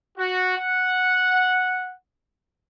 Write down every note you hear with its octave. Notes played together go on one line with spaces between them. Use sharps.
F#4
F#5